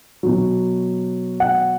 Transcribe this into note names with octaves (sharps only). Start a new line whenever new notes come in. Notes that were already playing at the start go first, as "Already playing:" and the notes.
B2 F#3
F#5